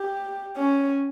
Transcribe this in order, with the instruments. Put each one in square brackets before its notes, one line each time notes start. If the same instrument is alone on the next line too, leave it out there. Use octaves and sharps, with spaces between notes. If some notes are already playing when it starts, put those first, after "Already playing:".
Already playing: [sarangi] G4
C#4